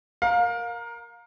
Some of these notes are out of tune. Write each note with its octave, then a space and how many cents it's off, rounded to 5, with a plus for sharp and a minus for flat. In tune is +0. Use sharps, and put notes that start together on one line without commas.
A#4 +0 F5 +25